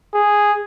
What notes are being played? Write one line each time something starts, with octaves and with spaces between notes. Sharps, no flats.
G#4